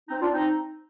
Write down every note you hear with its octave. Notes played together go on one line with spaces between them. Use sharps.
C4 D#4
D4 F4
C4 D#4